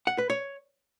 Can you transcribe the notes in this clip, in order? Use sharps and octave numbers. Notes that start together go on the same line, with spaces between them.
F#5
B4
C#5